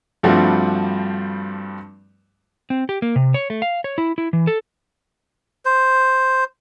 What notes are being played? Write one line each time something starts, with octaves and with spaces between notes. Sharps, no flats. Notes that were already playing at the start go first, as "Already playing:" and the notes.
G2 F3 G3 A3 C4 F#4
C4
G4
A#3
C3
C#5
A3
F5
C#5
E4
E4
E3
A4
C5